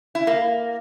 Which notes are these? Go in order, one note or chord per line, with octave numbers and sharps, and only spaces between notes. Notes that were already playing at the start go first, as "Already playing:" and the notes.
E4
A#3